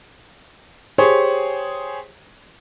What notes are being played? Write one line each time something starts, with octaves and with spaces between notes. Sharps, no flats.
G4 G#4 C5 C#5